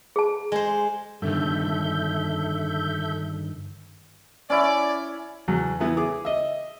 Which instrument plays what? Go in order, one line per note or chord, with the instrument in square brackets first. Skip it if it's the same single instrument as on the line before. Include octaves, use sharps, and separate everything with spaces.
[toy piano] G#4 A5
[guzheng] G#3 C5
[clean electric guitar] G2 D3 D#3 [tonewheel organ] A4 E5 G6
[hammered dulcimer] C#4 E4 [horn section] D5
[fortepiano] E2 F#3
E3 B3 E4
G#4 D6
D#5 E5